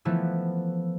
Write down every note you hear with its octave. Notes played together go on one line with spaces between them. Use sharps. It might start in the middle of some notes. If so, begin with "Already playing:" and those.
E3 F3 A3 B3 E4